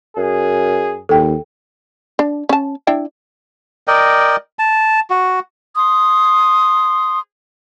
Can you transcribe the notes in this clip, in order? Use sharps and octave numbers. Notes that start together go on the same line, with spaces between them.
F#2 G#4
D#2 A4 G5
D4
C#4 A5
D4 E4 G5
A#4 D5 D#5 G5
A5
F#4
C6 D#6